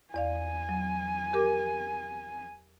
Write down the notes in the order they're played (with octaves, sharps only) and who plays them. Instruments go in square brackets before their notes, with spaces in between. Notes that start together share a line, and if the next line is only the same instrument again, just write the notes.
[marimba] E2 D5 F5 [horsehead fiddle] G#5
[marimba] F#3
G4 A#4 D6